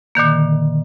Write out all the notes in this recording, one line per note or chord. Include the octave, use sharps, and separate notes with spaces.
A#2 D3 D#3 A#3